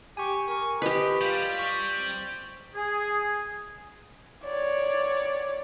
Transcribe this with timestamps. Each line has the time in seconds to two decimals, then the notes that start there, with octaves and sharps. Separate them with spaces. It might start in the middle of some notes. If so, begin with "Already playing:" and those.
0.17 G4 G#5 C#6
0.48 A#4 G#5 C#6
0.82 G4 B4 D#5
1.21 G3 F4
1.55 C#6 B6
1.98 C4
2.76 G#4
4.44 C#5 D5